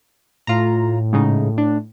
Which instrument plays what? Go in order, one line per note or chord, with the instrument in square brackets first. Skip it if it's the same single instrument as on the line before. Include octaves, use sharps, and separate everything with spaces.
[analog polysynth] A2 [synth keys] F4 A#5
[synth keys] G#2 C#3 D#4
D4